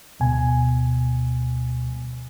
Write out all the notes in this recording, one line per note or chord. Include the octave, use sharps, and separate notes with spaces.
D2 B2 G#5